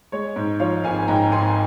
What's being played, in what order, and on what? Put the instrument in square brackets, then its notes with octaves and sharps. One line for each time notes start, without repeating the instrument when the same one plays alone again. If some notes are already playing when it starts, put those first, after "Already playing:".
[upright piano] G#3 C#5
G#2
F3 C#5 F5
G#1 F5 G#5
G#2 G5 A#5
G#1 G#5 C6